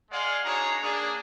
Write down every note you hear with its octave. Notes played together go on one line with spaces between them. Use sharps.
G#3 G#4 D5 F5 F#5 C6
D4 D#4 F#4 G#4 C#5 A#5
A#3 D4 G#4